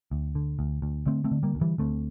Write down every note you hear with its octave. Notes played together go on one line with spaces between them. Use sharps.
D2
D3
D2
D2
D3 A3 C4
A3 C4
D3
G3 A#3
D2
E3 G3
D2 A3 C4